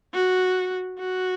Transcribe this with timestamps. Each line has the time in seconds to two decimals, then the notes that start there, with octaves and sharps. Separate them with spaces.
0.14 F#4
0.99 F#4